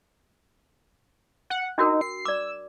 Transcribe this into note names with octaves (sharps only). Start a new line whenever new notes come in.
F#5
D4 D#4 F#4 A#4
C7
D5 D6 E6